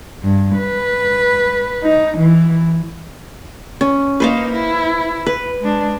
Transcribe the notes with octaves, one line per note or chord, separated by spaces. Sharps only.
G2
B4
D#4
E3
C#4
A#3 D#4 B4 C5 F5
E4
B4
G#3 D4